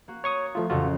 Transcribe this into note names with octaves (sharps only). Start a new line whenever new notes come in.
A#3 F#4
C#5 A#5 C#6 D#6
F3 A3 F4
A1 F2 C#3 F4 F#4 A4